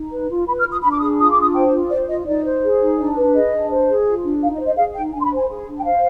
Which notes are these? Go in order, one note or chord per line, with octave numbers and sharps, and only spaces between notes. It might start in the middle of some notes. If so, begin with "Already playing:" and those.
Already playing: D#4
B4
F4
B4 B5
F6
F4
D#6
D4 B5
D6
G#4 D#6
F4 D#6
D6
D4 D#6
C5 G5
F4
C5 D5
F4 D#5
D#4 D5
C5
G#4
D#4
D4 D5
B4
G#4 D#5
D4
C5
G#4
F4
D4
D#4 F5
D#5
C5
D#5
G#4 F5
D#4 G5
D4 G#5
C6
B5
C5
G#5
G#4
D4
G5
C5 F5